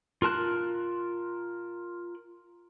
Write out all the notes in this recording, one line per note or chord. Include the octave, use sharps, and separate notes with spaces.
F4 A#4 A5 F#6